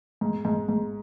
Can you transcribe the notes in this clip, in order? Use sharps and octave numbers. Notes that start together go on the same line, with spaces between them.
G#2
G#2
G#2